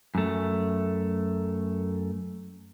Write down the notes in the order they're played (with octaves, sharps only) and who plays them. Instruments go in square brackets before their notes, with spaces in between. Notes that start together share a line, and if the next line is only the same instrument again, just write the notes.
[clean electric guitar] F#2 A3